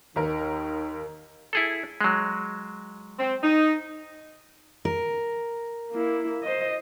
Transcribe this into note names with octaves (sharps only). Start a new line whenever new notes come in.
D#2 D#3 A#4
E4 G#4 A4
F#3 G#3
C4
D#4
A#4
A#3 E4
C5 D#5